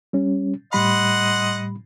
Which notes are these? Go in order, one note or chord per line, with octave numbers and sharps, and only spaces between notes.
G3 C#4
A2 G3 D#5 F#5 B5 C6